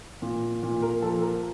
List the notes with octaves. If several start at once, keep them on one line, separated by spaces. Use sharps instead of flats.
A#2
A#2
A#4
F3 A4
A#4